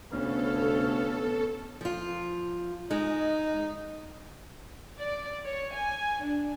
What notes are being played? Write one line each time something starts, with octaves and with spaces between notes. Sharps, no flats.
D2 C3 B3 C#4 A4 F5
F3 F4
G#3 D#4
D5
C#5
G#5
D4